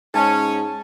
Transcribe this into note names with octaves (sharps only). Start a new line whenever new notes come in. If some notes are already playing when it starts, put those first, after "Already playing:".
G#2 C#4 A5